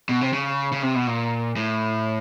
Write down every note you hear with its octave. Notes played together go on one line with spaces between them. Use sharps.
B2
C3
C#3
C#3
C3
B2
A#2
A2